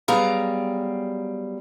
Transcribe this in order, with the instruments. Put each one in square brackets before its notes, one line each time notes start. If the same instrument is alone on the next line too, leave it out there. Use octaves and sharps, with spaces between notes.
[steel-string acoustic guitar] F#3 G3 B3 G#4 F5 A#5